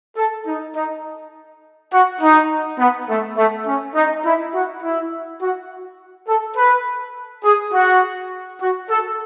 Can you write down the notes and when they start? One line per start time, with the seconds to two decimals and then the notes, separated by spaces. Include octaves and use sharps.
0.17 A4
0.47 D#4
0.76 D#4
1.92 F#4
2.21 D#4
2.79 B3
3.09 A3
3.37 A3
3.67 C#4
3.95 D#4
4.25 E4
4.55 F#4
4.83 E4
5.42 F#4
6.28 A4
6.57 B4
7.44 G#4
7.73 F#4
8.62 F#4
8.90 A4